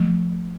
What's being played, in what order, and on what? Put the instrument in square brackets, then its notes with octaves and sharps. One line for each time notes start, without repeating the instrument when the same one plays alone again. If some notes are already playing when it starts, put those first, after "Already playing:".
Already playing: [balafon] F3 A3